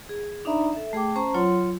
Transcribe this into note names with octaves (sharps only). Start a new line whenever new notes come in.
G#4
D4 D#4 D5 E5 A#5 B5
A4 E5
A3 G#4 G5 D6
C#4 C5 A5 A#5 C#6
F#3 F4 C#5 F#5 C6